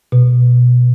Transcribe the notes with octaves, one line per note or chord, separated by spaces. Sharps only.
B2